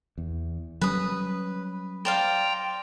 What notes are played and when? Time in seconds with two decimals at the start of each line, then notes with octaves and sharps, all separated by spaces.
0.18 E2
0.81 F#3 G3 C#4 B4 D#6
2.05 C5 D5 F5 G5 A#5